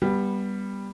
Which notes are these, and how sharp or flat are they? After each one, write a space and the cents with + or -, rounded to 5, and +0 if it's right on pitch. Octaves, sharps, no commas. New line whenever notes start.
G3 +5 B3 -15